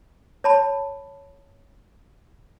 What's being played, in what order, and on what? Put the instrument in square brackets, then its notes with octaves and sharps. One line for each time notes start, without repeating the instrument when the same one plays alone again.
[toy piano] C#5 A5 B5